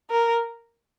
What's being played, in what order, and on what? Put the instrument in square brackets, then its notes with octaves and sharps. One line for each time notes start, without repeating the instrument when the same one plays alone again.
[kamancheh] A#4